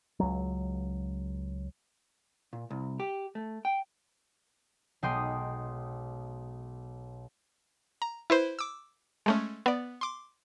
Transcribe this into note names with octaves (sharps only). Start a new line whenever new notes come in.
C#2 F#3
A#2
C2
G4
A3
G5
B1 G#3 G5 C6 D#6
A#5
E4 B4 C5
D6 E6
G#3 A3 C#4
B3 D5
C6 D6